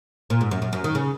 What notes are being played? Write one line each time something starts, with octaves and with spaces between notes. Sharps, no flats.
A#2
G#2
F#2
F#2
F#2
D#3
C#3